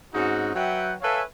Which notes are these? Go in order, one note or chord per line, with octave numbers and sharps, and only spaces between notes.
G#2 C4 C#4 D#4 F#4
F#3 B4 E5 F#5 G5
A4 B4 C#5 E5 F5 G#5